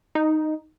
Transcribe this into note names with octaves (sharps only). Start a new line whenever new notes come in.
D#4